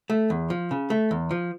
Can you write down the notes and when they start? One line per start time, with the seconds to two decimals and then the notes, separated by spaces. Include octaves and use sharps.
0.10 A3
0.30 E2
0.50 F3
0.71 C#3
0.90 A3
1.11 E2
1.31 F3